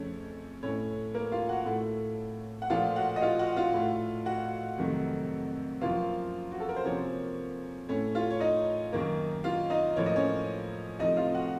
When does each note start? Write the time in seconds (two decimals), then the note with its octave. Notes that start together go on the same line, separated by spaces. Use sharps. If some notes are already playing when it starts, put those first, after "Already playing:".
Already playing: F2 C#3 A3 C#4 C#5
0.63 A2 A3 C#4 C#5
1.14 A#3 A#4
1.32 F4 F5
1.49 F#4 F#5
1.66 A2 A3
2.62 F#5
2.70 A#2 F3 A3 F4 F5
2.96 F#4 F#5
3.16 D#5
3.21 F4 F5
3.39 F#4 F#5
3.57 F4 F5
3.74 A2 A3
4.26 F#4 F#5
4.78 F2 C3 D#3 F#3 A3
5.81 F#2 F3 A#3 F4 F5
6.52 F#4
6.60 A4
6.69 A#4
6.76 C5
6.84 C3 F3 A#3 C#4 C#5
7.89 A2 A3 C#4 C#5
8.15 F4 F5
8.30 C#5
8.40 D#4 D#5
8.93 F#2 D#3 A#3
9.44 F4 F5
9.70 D#4 D#5
9.96 A2 F3 A#3 C#5
10.06 D#5
10.16 C#4 C#5
10.99 C3 F3 A3 D#4 D#5
11.17 F4 F5
11.35 F#4 F#5